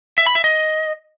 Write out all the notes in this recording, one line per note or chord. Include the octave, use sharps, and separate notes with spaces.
E5
B5
E5
D#5